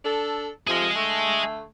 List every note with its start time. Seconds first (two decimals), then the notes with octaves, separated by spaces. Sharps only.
0.05 D4 A4
0.67 F2 C3 F3 G#4 D#5
0.95 D3 A3